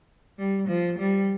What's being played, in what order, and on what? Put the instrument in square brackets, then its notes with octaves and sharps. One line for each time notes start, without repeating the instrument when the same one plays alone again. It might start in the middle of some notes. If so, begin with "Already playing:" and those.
[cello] G3
F3
G3